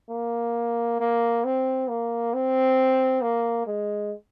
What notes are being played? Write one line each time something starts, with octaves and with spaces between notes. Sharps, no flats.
A#3
A#3
C4
A#3
C4
A#3
G#3